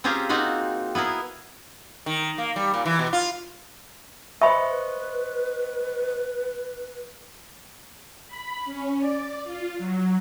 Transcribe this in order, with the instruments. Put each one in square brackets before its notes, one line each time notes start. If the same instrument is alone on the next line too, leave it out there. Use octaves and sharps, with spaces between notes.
[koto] C4 C#4 F4 G4 G#4 A#5
A#3 C4 D#4 F4 F#4 F#5
B3 E4 G#4 A#4
[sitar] D#3
A#3
G3
A#2
E3
B2
F4
[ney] B4 [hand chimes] C5 D#5 C#6 [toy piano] E5 B5
[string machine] B5
C#4
D5
F4
F#3